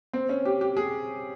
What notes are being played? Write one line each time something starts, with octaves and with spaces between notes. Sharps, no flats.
C4
C#4
G4
G4
G#4